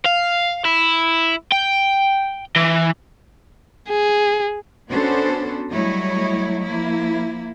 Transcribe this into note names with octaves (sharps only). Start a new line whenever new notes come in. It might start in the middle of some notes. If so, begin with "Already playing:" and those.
F5
E4
G5
E3
G#4
B3 C#4 D4 F#4 A4 C5
F#3 G3 A3 E4 C#5 D#5
F3 A#3 E4